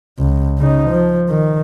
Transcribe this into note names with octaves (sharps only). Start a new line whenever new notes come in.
C#2
C#3 D#4
F3
D#3